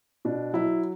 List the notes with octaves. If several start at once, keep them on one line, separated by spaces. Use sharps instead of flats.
B2 D4
F#3 E4